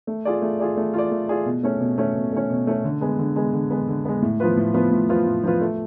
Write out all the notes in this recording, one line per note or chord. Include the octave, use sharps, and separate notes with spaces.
A3
F4 G#4 D5
A3
F4 G#4 D5
A3
F4 G#4 D5
A3
F4 G#4 D5
B2
A3 C#4
B2
A3 C#4
B2
A3 C#4
B2
A3 C#4
D3
G#3 B3
D3
G#3 B3
D3
G#3 B3
D3
G#3 B3
A2
F3 B3 F4 B4
A2
F3 B3 F4 B4
A2
F3 B3 F4 B4
A2
F3 B3 F4 B4
A3